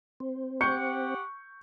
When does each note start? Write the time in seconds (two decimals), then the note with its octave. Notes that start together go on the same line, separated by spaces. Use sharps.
0.20 C4
0.61 G4 F#5 C#6 G6 C#7